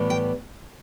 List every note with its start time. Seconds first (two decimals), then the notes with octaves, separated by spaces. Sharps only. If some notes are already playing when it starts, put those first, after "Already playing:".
Already playing: A2 E3 G3 B3
0.10 G5